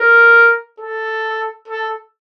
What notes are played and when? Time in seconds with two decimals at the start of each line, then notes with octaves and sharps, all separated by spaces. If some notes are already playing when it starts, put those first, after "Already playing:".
Already playing: A#4
0.80 A4
1.68 A4